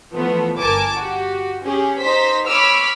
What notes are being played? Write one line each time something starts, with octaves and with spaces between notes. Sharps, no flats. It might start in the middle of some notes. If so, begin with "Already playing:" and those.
E3 F3 A3 B3
G1 A#4 G#5 A5 D6
F#4 G4
C#4 G4 G#4
D#4 C5 B6
C#5 B5 D6 E6 F6